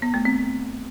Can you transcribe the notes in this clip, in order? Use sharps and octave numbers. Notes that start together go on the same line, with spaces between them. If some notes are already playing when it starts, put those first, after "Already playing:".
B3
A3
C4